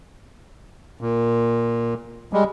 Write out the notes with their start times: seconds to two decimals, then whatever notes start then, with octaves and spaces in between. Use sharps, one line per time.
1.01 A#2
2.33 G3 G#3